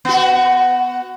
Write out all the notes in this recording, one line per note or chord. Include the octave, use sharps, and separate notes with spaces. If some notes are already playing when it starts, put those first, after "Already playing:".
B3 F#4